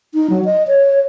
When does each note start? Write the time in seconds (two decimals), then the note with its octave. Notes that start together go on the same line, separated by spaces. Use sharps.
0.14 D#4
0.30 F#3
0.45 D#5
0.68 C#5